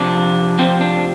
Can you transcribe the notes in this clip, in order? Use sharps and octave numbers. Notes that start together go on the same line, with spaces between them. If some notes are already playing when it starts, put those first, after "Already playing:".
Already playing: F2 C3 F3 D4
F2 C3 F3 C4
D4